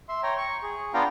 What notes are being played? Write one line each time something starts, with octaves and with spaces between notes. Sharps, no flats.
E5 C6
C#5 G5 A#5
C#6
G#4
B3 D4 F4 F5 G5 A#5